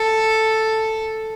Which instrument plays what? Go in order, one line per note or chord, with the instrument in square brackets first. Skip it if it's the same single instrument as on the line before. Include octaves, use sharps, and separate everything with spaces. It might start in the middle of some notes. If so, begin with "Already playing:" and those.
Already playing: [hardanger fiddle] A4